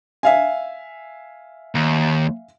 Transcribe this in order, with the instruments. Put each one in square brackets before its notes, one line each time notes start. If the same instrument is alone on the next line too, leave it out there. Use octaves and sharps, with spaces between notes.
[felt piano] E5 F5 G#5
[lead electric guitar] D#2